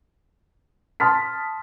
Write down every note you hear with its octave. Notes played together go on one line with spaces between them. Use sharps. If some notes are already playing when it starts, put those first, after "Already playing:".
A5 C6 D#6 F6 A6 B6